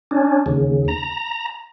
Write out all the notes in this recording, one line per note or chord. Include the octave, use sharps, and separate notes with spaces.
C#4 D4
D#2 C#3
A#5